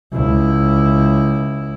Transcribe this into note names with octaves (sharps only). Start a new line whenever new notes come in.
C#2 E4